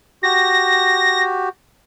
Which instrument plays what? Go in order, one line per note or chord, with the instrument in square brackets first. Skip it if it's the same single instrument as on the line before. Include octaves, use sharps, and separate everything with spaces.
[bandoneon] F#4 G4 [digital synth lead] A#6